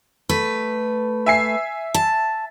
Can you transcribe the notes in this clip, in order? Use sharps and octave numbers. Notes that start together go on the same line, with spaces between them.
A3 B4
E5 G#5 C7
A5